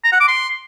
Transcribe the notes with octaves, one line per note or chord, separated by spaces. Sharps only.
A#5
F#5
D6
C6